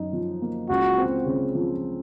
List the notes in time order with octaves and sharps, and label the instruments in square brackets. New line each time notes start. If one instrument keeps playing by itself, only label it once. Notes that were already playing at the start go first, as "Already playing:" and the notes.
Already playing: [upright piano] F#2 D#4
F3
A#3
[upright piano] C#2 [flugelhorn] F#4
[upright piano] C4
C#3
F3